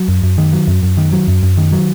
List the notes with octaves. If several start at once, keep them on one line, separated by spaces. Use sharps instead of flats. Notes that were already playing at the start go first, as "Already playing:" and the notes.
Already playing: F#3
F#2
F#2
D#3
F#3
F#2
F#2
D#3
F#3
F#2
F#2
D#3
F#3